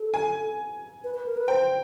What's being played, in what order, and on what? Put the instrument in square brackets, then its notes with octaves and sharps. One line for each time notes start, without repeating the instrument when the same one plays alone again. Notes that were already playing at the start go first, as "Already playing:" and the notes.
Already playing: [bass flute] A4
[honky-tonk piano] G#5
[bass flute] B4
B4
A#4
B4
[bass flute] C5 [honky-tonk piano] G5